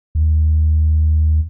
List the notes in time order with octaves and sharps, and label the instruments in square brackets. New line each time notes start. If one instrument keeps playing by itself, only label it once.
[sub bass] D#2